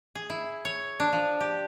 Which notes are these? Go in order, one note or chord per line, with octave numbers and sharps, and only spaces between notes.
G#4
E4
C#5
D4
F3
G4